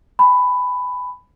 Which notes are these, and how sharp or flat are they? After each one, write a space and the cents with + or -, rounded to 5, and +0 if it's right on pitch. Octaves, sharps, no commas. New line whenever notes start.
G#5 +0 B5 +10